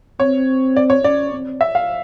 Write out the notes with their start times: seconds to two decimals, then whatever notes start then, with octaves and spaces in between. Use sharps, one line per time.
0.20 C4 C#5
0.76 D5
0.90 C#5
1.04 C#4 D5
1.33 C4
1.61 E5
1.75 F5